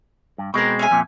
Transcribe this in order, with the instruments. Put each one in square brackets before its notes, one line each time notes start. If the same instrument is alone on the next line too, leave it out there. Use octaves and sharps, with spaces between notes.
[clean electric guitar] G2
[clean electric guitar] B2 G#3 C4 [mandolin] A#4 B4 G5
[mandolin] C#4 E5 G#5
[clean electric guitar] F2 A#2